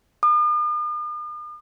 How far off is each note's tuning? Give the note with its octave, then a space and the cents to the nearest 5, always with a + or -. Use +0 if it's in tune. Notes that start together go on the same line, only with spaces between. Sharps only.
D#6 -45